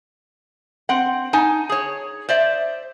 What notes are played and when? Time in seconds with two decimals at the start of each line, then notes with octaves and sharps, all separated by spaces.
0.89 C4 F#5
1.33 D#4 G#5 A5
1.69 G#4 C#5
2.29 C5 D5 E5